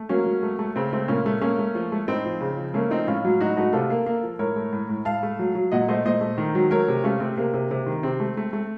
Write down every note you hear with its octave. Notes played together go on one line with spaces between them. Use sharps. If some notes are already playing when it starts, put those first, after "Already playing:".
Already playing: A3
F#3 A#3 C#4
F#3
A3
A3
C#3 C4
A3 C4
A#2 A#3 C#4
A3
A3 A#3 C#4
A3
F3
A3
A2 C4 D#4
F3
C#3
F3
A3 A#3 C#4
F3 C4 D#4
A2 C#4 F4
F#3
A2 D#4 F#4
A3 D#4 F#4
C3 F4 A4
A#3
A#3
F3
A2 A#4 C#5
A3
A2
A2
A2 F5 A5
A3
F#3
F#3
A#2 D#5 F#5
A3 C5 D#5
A#2 C5 D#5
A3
D#3
F#3
A3 A#4 C#5
C3
A3 C#4 F4
C3 C4
C3 A#3
C3
C3
D#3
C3 C4
A3
A3
A3